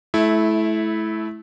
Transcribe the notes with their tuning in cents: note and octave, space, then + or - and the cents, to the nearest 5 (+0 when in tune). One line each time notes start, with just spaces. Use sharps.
A3 -30 E4 -5